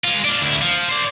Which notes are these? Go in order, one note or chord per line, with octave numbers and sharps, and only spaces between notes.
G#3 F4
D4 F4
D2 E4
F3
C5 D5